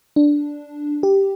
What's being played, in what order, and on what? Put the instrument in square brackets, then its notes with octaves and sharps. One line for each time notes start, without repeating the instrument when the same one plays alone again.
[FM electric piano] D4
G4